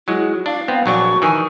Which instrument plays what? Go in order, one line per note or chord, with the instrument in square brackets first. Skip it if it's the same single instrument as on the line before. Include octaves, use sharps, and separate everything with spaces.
[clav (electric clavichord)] F#3 G#3 [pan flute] E4
[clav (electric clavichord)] D4 [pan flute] F5
[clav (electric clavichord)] B3 C4
[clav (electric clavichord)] A#1 F#3 D4 [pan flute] C#6
[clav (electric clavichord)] D#3 E3 [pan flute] G#5